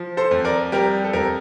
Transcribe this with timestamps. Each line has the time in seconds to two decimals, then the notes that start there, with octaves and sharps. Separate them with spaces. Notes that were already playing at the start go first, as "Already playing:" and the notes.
Already playing: F3
0.17 A4 C5
0.31 F2
0.45 A#4 D5
0.72 G3 G4 A#4
1.04 A4
1.13 F2 G4 A#4